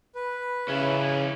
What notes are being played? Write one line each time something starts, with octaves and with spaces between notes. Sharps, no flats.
B4
C#3 C#4 E4